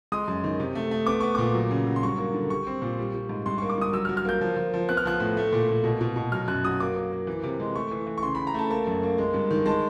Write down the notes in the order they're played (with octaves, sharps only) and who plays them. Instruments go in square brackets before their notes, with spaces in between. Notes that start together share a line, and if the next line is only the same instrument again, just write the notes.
[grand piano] G#3 D#6
F#2
D#3
C3
A3
A3
B3 D6
B3 C#6
A#2 D6
F#3
C#3
F#3
C6
G2 C#6
A#3
D3
G3 C#6
C4
A#2
G3
G3
G#2
G2 C6
A#3 C#6
D6
G2 D#6
F#3 E6
F6
F#3
F6
A#3 G6
F3
F3
F3
B3 F#6
F6
F3 F#6
A2
A3
A#2
A#2
B2
B2
B2
F#3 F6
F#2 F#6
F#3 D#6
A#3 D6
A#3
A#3
E3
C3
G#3
A3 C#6
E3
E3
C#6
C#3 C6
C#3 B5
A#5
A3 A5
A#3 A5
F#2
A#3
G#3
G2
D#3
G#3 A5